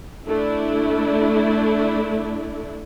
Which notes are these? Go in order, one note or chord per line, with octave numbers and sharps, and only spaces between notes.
A3 D4 E4